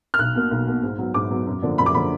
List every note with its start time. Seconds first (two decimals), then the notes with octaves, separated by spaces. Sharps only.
0.14 F6
0.19 B1 F#6
0.35 B2 A#3
0.51 B1
0.67 B2 A#3
0.83 G#2
0.99 F#3 B3
1.14 G#2 D6
1.31 F#3 B3
1.47 F#2
1.62 D3 F3 A#3 D4
1.78 F#2 B5
1.86 D6
1.94 D3 F3 A#3 D4 B5